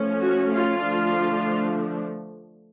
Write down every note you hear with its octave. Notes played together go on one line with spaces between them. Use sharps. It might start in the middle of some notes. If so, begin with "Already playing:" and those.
Already playing: F3 A3 C#4
F#4
F4
D3 F3 A3 D4